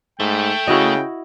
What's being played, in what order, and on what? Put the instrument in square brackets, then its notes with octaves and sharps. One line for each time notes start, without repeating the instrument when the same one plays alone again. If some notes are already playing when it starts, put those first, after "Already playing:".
[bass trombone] G#2 [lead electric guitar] A3 [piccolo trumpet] G5
[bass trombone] C#3 [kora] E4 F#4 D#5